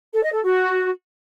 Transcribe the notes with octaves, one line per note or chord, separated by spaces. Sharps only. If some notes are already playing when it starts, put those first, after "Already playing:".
A4
D#5
A4
F#4